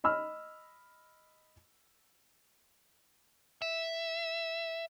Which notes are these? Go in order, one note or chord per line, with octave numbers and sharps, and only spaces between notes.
D#5 B5 E6 F6
E5